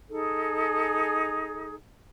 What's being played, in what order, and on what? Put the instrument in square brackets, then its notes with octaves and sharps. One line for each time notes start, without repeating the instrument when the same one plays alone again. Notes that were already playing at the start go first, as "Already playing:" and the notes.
[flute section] D#4 G#4 A4